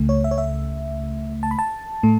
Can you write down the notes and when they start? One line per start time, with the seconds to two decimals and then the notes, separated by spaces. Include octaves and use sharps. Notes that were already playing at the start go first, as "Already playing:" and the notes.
Already playing: C#2 C#3 A3
0.09 C#5
0.24 E5
0.31 C#5
0.38 E5
1.43 A5
1.51 B5
1.59 A5
2.03 A2 A3